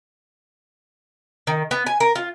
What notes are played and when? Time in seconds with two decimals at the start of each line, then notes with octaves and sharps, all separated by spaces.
1.47 D#3
1.71 B3
1.86 G#5
2.00 A#4
2.15 F4